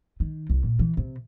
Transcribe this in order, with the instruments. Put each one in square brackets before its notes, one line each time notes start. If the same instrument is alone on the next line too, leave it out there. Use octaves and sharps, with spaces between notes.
[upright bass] D#3
C2
A#2
E3
C3